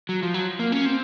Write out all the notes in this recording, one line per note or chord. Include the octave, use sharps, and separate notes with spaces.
F#3
F3
F#3
A#3
C#4
C4